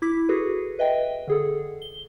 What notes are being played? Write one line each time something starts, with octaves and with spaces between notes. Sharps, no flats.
E4 D6 B6
F#4 G#4 A4 B4
B4 D#5 E5 G5
D3 G#4 A4
G7